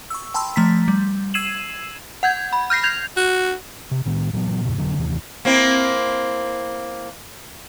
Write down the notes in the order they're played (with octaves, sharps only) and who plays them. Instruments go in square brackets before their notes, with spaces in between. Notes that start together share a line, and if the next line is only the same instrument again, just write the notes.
[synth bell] C#6 E6
G5 A5 B5 C6 E6
F3 A3 A#5 B6
G3
E6 G#6 C7 D#7 E7 F#7
F#5 G6 G#6
B5
F6 G6 A#6 C7
G6 G#6 F7
[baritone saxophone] F#4
[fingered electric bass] C3
A2 D#3 B3
A#2 E3 F#3 B3
E2 A2 C3
F1 D3 F#3 D4
D#2 C3 D#3 E3
[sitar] A#3 C4 E4